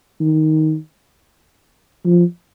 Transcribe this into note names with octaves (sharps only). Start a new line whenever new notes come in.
D#3
F3